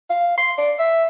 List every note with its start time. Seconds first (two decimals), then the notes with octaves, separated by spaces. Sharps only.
0.10 F5
0.38 C6
0.58 D5
0.79 E5